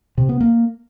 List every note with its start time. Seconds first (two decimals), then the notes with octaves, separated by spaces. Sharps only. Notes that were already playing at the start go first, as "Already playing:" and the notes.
0.18 C3
0.29 B3
0.40 A#3